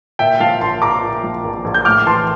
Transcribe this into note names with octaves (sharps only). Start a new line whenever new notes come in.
A#2 E5 G5
F3 F5 A5
A#1 A5 C6
A#1 A#5 D6
A#2
F3
A#1
A#1
G6
A2 D6 F6
E3 A5 C6